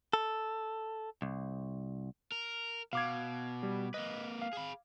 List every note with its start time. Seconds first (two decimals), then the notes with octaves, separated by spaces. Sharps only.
0.13 A4
1.22 C2
2.32 A#4
2.93 B2 F5 D6 G#6
3.63 G3
3.94 A#3 B4 D#5
4.42 F5
4.53 G#4 B5